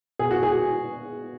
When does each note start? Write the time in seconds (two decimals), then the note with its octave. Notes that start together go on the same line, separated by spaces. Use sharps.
0.19 B2 G#4
0.31 F#4
0.43 G#4